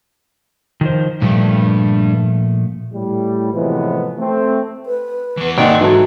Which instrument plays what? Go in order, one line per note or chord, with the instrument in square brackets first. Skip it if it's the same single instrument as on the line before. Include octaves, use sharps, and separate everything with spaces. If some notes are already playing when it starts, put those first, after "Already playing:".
[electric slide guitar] D#3 F3 C5
[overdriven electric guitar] G2 [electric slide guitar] A#2 F3 A3
[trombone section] A2 G3
A2 C3 E3 F3 G#3 B3
A3 C4
[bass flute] B4
[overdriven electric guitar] E3 B3
[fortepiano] G#1 D5 F#5 [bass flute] A#3 [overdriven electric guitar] B4 G5
[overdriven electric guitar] G#2 [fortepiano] E3 F#3 A4 [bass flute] F#4